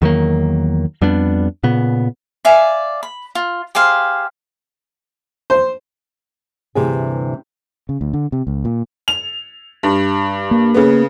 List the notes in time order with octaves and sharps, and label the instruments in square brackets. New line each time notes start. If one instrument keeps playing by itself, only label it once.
[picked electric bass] E2 D#3 F#3 A#3
F2 G3 B3 D4
A#2 C#3 B3
[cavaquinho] D5 E5 F5 G#5
B5
F4
G4 G#4 C5 F5
[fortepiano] C5
[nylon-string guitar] D2 G2 C3 E3 G4 G#4
[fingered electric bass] C#3
D2
D3
C3
C#2
A#2
[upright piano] F7
G2
[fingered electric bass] A#3
[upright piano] C#3 B3